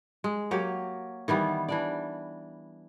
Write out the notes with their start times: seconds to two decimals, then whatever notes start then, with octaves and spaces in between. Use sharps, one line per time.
0.24 G#3
0.51 F#3 A#3 G4
1.28 D#3 E3 G3 B3
1.69 E3 D4 D5